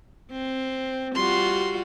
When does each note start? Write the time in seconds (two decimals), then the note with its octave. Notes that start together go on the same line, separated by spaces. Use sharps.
0.31 C4
1.15 G3 F4 F#4 C6